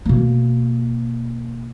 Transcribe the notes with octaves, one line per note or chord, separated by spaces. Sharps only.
B2 A#3